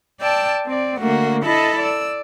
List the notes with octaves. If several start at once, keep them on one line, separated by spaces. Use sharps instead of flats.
D5 G5 A5 E6
C4 D5
D3 A3 A#3 F#4
E4 A4 D#5 A5 B5
D5 E6